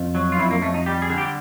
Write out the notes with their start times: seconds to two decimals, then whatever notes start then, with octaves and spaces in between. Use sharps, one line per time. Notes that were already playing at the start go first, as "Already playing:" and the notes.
Already playing: F2
0.15 F#3
0.32 F4
0.39 F2 E4
0.51 A#3
0.62 F2 A3
0.74 D#4
0.86 G3 G4
1.02 G#4
1.10 D3
1.18 G4